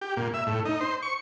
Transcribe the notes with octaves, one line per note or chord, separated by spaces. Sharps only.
G4
A#2
E5
A2
D#4
C5
C#6